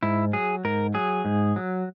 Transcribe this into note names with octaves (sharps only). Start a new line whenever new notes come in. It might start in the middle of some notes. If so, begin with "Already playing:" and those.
G#2 E4
F#3 G#4
G#2 A#4
F#3 G#4
G#2
F#3